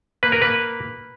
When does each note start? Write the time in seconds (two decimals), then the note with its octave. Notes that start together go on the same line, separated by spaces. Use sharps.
0.23 A#3 B4
0.32 A#4
0.42 A#3 B4